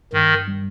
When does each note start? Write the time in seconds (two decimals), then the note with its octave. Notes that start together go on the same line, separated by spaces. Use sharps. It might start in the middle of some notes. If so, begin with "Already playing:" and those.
0.13 G2 D#3
0.48 G3